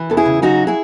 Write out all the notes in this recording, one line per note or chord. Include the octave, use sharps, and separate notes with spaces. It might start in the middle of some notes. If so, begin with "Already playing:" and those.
Already playing: E3
E2 A4
E4 G#4
C#3
F#3 D#4 F#4
E4 G#4